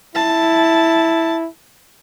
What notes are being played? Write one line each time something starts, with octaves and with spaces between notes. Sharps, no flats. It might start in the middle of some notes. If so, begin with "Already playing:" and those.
E4 A5